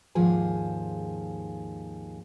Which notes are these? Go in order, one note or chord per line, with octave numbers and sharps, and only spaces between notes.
D#2 G#2 F3 G#4 G#5